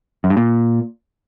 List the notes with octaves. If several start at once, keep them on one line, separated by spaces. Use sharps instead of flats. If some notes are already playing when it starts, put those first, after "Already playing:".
F#2
G2
A#2